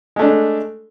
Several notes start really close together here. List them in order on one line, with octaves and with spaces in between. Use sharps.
G#3 A3 D4